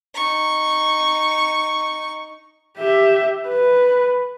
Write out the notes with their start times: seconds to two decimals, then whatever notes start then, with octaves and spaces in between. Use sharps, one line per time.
0.14 D#4 C#6
2.78 G4 E5
3.48 B4